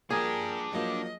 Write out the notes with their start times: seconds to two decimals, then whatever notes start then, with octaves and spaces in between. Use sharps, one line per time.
0.10 F3 A#3 D4 G4 G#4 A#4
0.72 F3 F#3 A#3 D#5